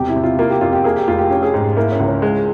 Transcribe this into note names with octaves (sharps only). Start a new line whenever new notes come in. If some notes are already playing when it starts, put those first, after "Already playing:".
Already playing: E1 C3 G4
E4
C3
F4
A#3 F4
G4
F2 F4
G4
A#3 G#4
G4
F1 F4
G4
C#4 G4
G#4
G#2 G4
A#3 E4
C#4
C#2
C#4
G#3